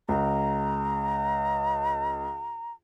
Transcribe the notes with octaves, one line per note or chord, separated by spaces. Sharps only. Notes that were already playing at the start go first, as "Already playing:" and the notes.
C#2 A#5